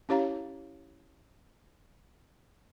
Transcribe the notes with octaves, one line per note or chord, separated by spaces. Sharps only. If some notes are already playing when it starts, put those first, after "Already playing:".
C#4 E4 G4 C#5 F5 A#5